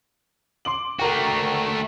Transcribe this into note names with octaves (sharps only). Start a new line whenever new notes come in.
C6 D6 F#7
A3 F#4 A#4 G5